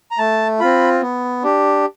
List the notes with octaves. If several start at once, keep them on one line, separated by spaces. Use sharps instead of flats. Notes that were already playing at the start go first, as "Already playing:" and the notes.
A#5
A3 A5
C4 F4 B5
B3
D4 G4